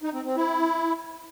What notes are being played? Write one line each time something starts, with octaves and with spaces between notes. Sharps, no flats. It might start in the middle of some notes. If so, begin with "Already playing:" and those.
D#4
C4
C4
E4